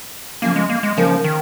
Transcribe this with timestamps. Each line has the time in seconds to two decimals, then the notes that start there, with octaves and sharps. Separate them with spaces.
0.42 F2 C#3 F3 A#3 C#4
0.56 G#3
0.69 A#3
0.83 G#3
0.97 D#2 C#3 F3 A#3 D#4 C#5
1.24 D#3